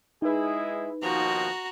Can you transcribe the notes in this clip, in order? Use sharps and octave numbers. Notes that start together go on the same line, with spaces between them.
G#3 D#4 E4 G#4 B4
D#2 B2 F3 F#4 A#5